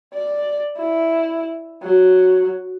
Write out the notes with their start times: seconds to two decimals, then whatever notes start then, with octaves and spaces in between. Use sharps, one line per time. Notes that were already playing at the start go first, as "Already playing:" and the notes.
0.14 D5
0.78 E4
1.83 F#3